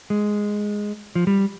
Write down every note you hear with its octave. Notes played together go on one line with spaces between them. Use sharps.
G#3
F3
G3